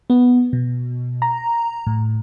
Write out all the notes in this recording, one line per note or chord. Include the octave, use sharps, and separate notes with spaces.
B3
B2
A#5
A2